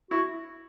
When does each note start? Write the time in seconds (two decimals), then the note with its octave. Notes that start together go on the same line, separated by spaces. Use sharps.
0.11 E4 F#4